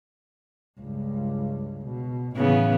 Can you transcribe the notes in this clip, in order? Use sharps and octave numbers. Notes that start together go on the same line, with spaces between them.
C#2 G2
B2
A2 C#3 E3 B3